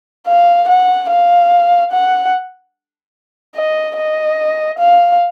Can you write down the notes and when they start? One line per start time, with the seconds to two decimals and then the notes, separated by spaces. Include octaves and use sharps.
0.28 F5
0.69 F#5
1.10 F5
1.92 F#5
3.56 D#5
3.98 D#5
4.79 F5